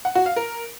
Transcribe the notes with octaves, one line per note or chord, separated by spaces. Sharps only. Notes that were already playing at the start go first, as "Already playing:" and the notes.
F#5
F#4
F5
A#4